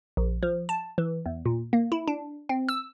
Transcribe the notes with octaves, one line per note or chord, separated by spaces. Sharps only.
A#1
F3
A5
E3
E2
A#2
A#3
E4
D4
C4
E6